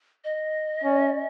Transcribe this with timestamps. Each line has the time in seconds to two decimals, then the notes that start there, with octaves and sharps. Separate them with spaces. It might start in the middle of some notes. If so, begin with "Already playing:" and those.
0.24 D#5
0.84 C#4